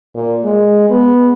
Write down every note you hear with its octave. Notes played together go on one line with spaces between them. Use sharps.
A#2
G#3
B3